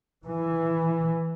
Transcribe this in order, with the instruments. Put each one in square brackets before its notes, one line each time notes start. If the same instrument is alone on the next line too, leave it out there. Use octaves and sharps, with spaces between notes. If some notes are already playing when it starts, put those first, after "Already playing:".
[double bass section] E3